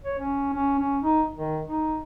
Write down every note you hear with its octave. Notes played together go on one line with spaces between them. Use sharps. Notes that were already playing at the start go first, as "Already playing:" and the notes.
C#5
C#4
C#4
C#4
D#4
D#3
D#4